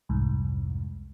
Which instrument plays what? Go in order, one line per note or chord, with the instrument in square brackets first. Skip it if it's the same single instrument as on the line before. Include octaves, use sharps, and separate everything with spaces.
[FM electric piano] C2 F2 G#2